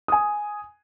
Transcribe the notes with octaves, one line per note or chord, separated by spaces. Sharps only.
G#5 D#6